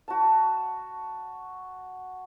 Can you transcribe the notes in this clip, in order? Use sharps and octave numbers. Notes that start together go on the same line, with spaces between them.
F#4 A5